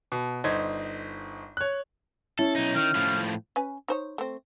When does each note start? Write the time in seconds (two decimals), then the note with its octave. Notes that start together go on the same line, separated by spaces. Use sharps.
0.12 B2
0.44 G1 D#4 C5 G#6
1.57 C#5 F#6
2.39 C#4 E4 A4
2.56 B1 D#4
2.75 D#3 F6
2.95 A2 F3
3.56 C#4 B4 G#5
3.88 D#4 C5 C#5
4.18 A3 C4